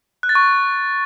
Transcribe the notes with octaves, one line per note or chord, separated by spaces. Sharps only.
F#6
A6
C#6